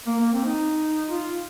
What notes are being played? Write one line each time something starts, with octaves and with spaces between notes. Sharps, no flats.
A#3
A#3
C4
D#4
F4